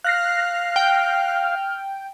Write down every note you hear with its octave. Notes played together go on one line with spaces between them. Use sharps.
F5 F6 F#6 A#6 C7
G5